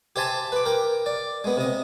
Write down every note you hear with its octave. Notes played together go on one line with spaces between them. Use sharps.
G4 C5 E5 G#5 A5
B4 D6
A#4 G5
D5
G#3 B3
C3 D#5